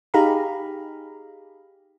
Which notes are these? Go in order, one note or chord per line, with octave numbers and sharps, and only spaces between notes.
D#4 G4 G#4 F5 A#5 B5